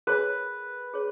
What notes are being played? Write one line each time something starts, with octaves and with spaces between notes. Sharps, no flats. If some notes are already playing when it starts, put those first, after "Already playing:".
G#4 B4 C#5 G#5
G#4 C#5